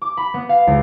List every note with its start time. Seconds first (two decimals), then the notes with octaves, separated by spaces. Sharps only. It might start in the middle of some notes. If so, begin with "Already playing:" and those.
0.02 D6
0.17 B5
0.34 B3
0.49 F5
0.67 C#2